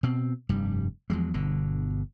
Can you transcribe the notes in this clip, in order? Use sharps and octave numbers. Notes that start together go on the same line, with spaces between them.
B2 C4
F1 G2 G3
E2 F3 F#3 G#3
G1 B2 D3